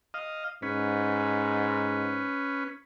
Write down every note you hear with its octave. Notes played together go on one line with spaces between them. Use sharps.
D#5 F5
G#2 C#4 B4